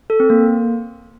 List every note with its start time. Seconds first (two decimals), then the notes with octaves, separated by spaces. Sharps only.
0.10 A4
0.20 C4
0.30 A#3